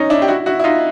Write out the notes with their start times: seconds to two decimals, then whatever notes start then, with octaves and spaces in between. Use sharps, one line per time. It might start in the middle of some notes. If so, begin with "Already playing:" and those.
Already playing: C#4 D#4
0.10 D4 E4
0.22 G4
0.28 E4 F#4
0.46 E4 F#4
0.59 E4
0.64 D#4 F4